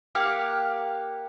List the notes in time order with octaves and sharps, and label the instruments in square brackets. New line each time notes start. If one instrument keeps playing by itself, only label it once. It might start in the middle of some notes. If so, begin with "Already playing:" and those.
[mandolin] A#3 G4 F5 F#5